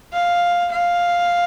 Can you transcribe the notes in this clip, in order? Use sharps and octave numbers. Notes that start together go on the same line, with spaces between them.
F5
F5